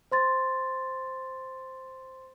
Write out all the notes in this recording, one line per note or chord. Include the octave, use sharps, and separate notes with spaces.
C5 C6 A6